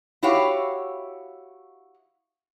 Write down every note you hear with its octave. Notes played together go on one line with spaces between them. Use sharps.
E4 F#4 G4 C#5 F5